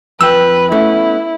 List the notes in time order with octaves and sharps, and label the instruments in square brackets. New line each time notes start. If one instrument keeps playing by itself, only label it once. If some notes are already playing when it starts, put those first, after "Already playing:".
[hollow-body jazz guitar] F2 G5 [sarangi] B4 [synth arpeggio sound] E6
[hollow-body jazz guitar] A3 B3 C#4 [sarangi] E4